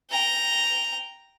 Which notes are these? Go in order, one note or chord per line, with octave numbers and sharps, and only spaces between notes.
G5 A#5